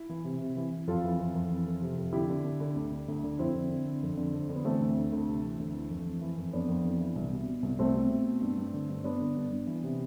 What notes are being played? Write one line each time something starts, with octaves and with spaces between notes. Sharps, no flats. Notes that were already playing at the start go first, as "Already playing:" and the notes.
Already playing: E4
E3
C3
C3
E3
E3
F2 F4 A4
E3
F2
F2
E3
F2
C3
F2
D3 E4 G4
D3
D3
D3
D2
D3
D2
D3
F2 C4 E4
D3
D3
D3
F2
D3
F2
D3
B3
E3 A3 C4
D2
D2
D2
C3
E3
D2
E3
F2
E3
E3
F2
F2 B3 D4
F2
E3
E3
C2
B2
B2
C2
C2 A3 C4
B2
B2
B2
G2
G2
D3
G2
G2 B3 D4
D3
G2
G2
E3
C3